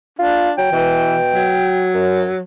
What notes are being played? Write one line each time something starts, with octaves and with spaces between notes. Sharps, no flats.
D4 F4
F#3 G5
B2 E3
F#3
F#2